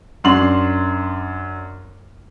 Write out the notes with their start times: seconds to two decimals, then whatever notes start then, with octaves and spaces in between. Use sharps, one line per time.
0.24 F#2 D4 C6 F#7